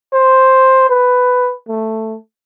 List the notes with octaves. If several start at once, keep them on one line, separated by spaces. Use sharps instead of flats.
C5
B4
A3